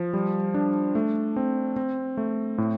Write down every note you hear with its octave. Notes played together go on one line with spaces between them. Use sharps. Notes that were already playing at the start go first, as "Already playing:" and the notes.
Already playing: F3
G3
D4
A3
C4
C4
A3
A2